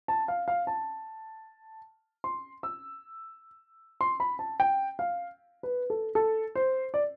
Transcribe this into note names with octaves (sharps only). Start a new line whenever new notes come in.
A5
F5
F5
A5
C6
E6
C6
B5
A5
G5
F5
B4
A4
A4
C5
D5